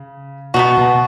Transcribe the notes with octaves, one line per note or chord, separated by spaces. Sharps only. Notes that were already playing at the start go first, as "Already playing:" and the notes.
Already playing: C#3
B2 B3 D#4 F#4
B2